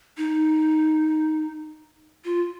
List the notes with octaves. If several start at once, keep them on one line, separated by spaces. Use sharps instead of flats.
D#4
F4